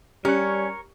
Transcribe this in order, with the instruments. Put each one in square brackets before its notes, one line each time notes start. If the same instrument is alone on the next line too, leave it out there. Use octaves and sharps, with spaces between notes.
[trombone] G3 [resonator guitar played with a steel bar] C#4 [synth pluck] G4 F#6 [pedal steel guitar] A#4 C#5